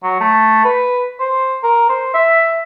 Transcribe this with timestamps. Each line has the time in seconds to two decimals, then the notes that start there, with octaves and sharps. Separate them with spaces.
0.03 F#3
0.20 A3
0.65 B4
1.20 C5
1.63 A#4
1.89 C5
2.14 E5